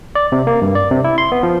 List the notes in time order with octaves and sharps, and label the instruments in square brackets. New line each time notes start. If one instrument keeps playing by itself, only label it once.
[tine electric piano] D5
C3
A#3
G2
D5
C3
E4
C6
B3
F3